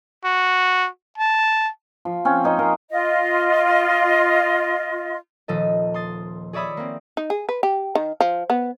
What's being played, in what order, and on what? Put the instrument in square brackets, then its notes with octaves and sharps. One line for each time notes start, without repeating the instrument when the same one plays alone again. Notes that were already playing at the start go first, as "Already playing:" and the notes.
[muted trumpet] F#4
A5
[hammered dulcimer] F3
C4 C#4
C#4 D#4 D#5
A#4 F5 A#5 C6
[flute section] F4 D#5
[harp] D#1 F3 A4 D#5
C6 D#6 A6
G#4 C#5 D5 E5 B5 D#6
A#3 C4
[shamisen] D#4
G#4
B4
G4
D#3
F3
B3